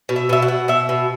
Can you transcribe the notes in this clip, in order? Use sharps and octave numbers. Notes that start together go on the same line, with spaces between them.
B2
E5
B2 E5
F#5
B2
B2 E5
B2